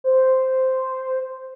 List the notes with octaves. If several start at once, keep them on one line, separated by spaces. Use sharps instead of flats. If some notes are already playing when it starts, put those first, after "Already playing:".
C5